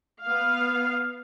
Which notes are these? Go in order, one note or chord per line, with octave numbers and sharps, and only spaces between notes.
B3 F5